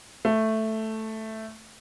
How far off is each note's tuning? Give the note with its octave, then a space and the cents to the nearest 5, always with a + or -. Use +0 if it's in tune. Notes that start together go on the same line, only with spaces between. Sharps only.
A3 +0